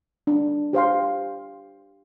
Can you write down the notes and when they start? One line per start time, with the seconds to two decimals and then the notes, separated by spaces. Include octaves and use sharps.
0.27 D4
0.73 G4 C5 F5 C6